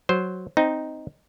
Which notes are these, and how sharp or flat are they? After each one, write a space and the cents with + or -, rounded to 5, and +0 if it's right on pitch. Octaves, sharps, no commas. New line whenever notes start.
F#3 +0 C5 +0
C4 +0 D#4 +0